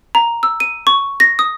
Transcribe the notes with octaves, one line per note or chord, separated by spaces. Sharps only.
A#5
E6
D#7
C#6
A#6
D#6